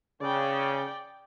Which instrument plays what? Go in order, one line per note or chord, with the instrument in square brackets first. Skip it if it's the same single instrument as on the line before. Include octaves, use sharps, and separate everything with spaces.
[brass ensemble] C#3 [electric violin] D5 G5